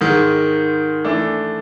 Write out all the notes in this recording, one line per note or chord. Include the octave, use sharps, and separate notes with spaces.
G#2 D#3 G#3
E3 A3 D4